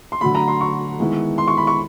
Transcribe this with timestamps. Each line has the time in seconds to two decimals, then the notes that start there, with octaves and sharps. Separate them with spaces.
0.12 C6
0.21 D3 F#3 A3 B5
0.35 A#5
0.48 C6
0.61 C#6
0.99 D#3 G#3 B3 E4
1.38 C6
1.48 C#6
1.57 B5
1.67 C#6